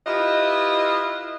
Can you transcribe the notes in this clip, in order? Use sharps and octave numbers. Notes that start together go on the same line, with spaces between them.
E4 F4 G4 B4 D#5 E5